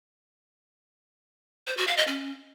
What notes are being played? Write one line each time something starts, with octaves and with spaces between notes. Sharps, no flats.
C5
F#4
F5
D#5
C#4